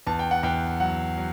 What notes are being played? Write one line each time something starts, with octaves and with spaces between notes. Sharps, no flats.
E2 A5
G5
F#5
E2 G5
F#3 F#5
F#3